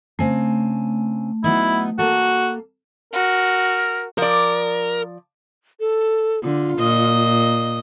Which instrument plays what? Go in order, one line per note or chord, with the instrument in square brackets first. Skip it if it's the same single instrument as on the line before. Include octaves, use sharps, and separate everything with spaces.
[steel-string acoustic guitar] C#3 C4 G#5 [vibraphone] A3
[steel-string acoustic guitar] F#3 B3 D#4 [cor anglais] E4
[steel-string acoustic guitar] A#3 A4 [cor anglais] F#4
[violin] F#4 [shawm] A#4
[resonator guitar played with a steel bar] F3 D5 [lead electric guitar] A#4
[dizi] A4
[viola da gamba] D3 [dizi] F4
[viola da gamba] A#2 D#5